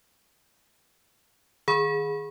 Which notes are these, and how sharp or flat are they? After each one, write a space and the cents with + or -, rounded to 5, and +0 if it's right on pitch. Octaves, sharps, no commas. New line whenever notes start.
D#3 +0 G#4 +0 B5 -15